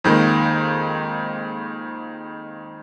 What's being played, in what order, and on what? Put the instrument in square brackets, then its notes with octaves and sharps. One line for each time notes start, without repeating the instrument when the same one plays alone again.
[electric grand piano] F2 D#3 G#3 A#3